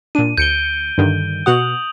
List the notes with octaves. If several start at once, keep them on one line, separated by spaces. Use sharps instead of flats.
A#2 D4 D#7
D2 G6 C#7 D7 G7
G2 D3 D#3
B2 F#4 F#5 D#6 F7 F#7